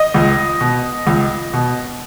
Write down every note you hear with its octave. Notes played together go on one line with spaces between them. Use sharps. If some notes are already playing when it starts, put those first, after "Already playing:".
Already playing: D#5
C#2
B2
C#2
B2